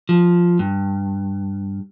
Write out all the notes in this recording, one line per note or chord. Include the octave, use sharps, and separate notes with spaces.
F3
G2